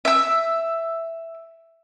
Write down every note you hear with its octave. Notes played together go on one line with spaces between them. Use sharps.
E5 E6